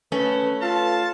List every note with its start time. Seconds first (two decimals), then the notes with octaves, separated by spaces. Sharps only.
0.12 A3 C#4 B4
0.61 F4 A4 F5 A5